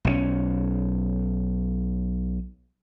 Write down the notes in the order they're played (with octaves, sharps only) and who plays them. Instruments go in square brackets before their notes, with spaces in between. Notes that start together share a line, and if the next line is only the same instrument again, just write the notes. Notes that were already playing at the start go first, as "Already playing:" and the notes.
[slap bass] B1 F3 C#4